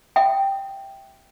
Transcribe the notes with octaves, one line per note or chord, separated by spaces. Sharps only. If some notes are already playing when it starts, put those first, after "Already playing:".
E5 G5